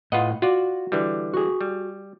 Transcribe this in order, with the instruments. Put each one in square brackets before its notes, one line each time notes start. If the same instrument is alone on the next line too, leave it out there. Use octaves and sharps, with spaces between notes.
[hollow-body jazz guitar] A2 F#5 [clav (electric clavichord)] F4 B4 D#5
[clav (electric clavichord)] F4 D5 [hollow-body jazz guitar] F#4
[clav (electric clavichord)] D3 E3 G3
[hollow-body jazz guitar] F#4 G#4
[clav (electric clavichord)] G3